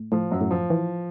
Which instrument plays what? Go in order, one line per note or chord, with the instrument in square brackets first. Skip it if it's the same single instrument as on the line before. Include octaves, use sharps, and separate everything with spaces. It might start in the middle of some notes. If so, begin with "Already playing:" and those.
Already playing: [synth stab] A2
[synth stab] A2 [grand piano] F3
[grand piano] F#2 F#3
[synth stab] A2
[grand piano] F3
[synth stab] E3